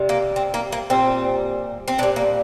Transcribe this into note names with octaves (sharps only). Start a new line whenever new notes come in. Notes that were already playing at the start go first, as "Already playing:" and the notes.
Already playing: C3 G3
A#3
C4
A#3
A#3
A#2 G3 C4
C4
A#2 G3 D4
A#3